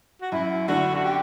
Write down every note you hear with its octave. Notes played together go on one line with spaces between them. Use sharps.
F#4
F#2 E4
D3 A3 D4 F#4
F#4
G4